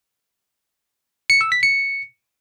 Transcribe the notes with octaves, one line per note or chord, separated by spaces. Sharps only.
C#7
E6
B6
C#7